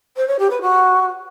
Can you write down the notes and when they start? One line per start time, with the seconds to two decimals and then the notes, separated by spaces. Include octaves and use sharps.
0.17 C5
0.28 C#5
0.39 G4
0.50 B4
0.62 F#4